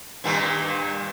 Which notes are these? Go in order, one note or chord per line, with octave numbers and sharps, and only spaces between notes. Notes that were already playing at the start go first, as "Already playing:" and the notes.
G2 A#2 D#3